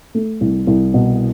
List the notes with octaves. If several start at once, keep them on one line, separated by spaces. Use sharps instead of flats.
A3
C2
C2
B2